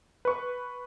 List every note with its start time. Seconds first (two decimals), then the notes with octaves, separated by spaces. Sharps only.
0.25 B4 C#6